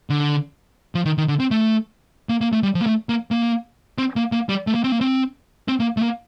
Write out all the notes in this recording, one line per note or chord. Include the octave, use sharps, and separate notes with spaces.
D3
F3
D#3
D#3
D3
C4
A3
A#3
A#3
A3
G3
F3
A#3
A3
A#3
A#3
C4
A#3
A#3
G3
A3
A#3
C4
A#3
C4
C4
A#3
A3
A#3